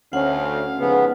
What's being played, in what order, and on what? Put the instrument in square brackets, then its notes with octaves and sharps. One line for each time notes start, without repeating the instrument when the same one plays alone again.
[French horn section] D2 C#4 [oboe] F5 [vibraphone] F#5
[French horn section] F2 G#2 C#3 [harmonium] B3